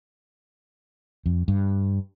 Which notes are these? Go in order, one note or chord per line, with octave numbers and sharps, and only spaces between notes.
F2
G2